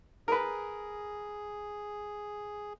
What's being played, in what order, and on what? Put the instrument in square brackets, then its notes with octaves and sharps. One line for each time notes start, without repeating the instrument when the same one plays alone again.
[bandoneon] G#4 [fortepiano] A#4 B4